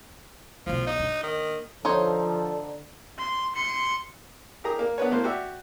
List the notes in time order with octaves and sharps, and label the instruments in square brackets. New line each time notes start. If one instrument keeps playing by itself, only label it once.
[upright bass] B1 E2 [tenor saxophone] F3
[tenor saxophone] D#4
[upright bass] A#3 D4
[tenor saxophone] D#3
[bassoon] D3 [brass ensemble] F3 [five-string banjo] D#4 C5 C#5 [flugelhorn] A4
[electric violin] C6
C6 C#7
[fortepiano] G4 G#4 A#4 A#5 D#6
A#3
B3 D4 A#4 B4 C#5
B2 E3 A3 A#3 C5 C6
F#4 G4 D5 E5